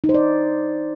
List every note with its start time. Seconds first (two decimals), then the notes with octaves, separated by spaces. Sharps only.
0.04 D#4
0.09 C5
0.14 D5